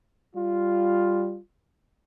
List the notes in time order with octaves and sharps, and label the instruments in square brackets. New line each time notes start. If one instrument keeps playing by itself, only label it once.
[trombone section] G3 F4